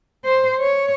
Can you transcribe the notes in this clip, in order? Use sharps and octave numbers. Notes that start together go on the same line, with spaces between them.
C5
C#5